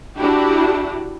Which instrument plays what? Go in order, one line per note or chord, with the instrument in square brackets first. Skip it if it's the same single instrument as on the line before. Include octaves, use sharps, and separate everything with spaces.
[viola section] D4 E4 F#4 G4